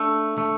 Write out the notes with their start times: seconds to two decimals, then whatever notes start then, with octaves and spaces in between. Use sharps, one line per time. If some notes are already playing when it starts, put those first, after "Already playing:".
Already playing: A3 D4
0.38 A3